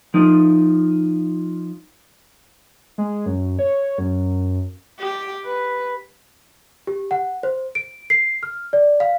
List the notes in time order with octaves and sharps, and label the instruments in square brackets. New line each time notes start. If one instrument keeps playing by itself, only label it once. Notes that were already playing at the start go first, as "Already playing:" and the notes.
[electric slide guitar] F3 D#4
[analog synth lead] G#3
F#2
C#5
F#2
[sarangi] G4
B4
[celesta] G4
F#5
C5
D7
C7
F6
D5
F5